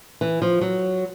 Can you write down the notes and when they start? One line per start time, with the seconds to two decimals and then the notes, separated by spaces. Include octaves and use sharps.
0.21 E3
0.42 F3
0.61 F#3